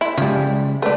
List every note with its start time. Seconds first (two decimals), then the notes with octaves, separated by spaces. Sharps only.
0.01 E4
0.18 C#3 F3 G3 G#3
0.82 A3 D4 B4